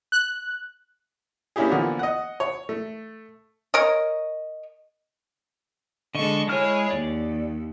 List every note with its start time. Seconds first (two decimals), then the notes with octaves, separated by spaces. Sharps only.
0.12 F#6
1.56 A#3 C#4 D4 E4 G4 G#4
1.70 D3 E3 F3 A#3 B3
1.99 D#5 F#5
2.40 C#5
2.69 A3
3.74 A#4 C#5 D#5
6.15 D3 G#3 A4 D#5 C#6
6.48 G#3 E4 G#4 C#5 F6
6.91 D#2 D5